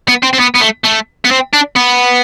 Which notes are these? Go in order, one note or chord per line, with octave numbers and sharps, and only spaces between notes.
B3
C4
C4
B3
B3
A3
A3
B3
C4
D4
B3